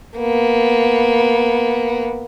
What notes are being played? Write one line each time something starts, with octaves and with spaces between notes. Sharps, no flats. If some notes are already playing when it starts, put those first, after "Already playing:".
A#3 B3